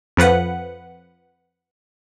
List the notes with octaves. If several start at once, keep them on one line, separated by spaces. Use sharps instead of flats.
F2 F3 B4 F#5